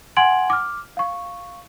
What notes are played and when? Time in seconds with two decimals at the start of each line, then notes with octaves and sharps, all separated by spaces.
0.17 F#5 G#5 C6 G#6 D7 F#7
0.50 D6 F6
0.97 F5 C#6